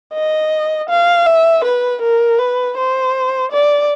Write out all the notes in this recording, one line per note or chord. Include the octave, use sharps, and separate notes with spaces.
D#5
F5
E5
B4
A#4
B4
C5
D5